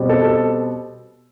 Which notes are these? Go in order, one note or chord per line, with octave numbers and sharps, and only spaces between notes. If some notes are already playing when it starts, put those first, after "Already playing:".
Already playing: B2 G3 C4
A4
A4